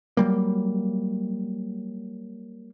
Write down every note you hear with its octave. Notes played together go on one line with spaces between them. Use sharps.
F#3 G3 A#3